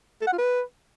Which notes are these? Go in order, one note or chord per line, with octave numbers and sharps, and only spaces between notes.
A4
F#5
F4
B4